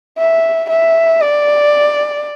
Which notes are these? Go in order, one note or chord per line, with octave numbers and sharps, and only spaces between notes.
E5
E5
D5